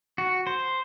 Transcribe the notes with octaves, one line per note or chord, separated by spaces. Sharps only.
F#4
C5